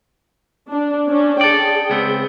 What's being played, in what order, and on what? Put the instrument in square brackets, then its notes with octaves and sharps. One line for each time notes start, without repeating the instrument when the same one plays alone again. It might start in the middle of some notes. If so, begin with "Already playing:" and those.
[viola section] D4
C#4 D4
[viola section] G#4 G5 [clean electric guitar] A4 D5
[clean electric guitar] C#2 B3 C4